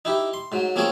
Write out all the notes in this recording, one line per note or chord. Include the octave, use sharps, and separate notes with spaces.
D#4 E4 G4
C6
G#2 F#3
F3 A#3 C4 C#4 G#4 C#5